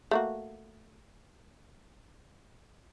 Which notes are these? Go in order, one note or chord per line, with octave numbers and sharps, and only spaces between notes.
A3 A#3 F#4